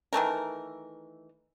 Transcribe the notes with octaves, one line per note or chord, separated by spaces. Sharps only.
D#3 E3 A3 A#4